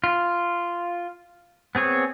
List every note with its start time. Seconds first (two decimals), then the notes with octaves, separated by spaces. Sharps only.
0.04 F4
1.75 B3 C4 G#4 C#5